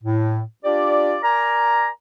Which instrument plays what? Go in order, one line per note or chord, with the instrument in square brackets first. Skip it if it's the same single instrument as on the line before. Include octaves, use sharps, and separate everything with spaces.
[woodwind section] A2
D4 F4 G4 D5
A#4 D5 G#5 A#5